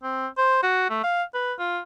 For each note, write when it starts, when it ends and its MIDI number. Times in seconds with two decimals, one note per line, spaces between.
0.03 0.27 60
0.38 0.59 72
0.63 0.89 66
0.90 1.00 57
1.04 1.23 77
1.34 1.53 71
1.59 1.80 65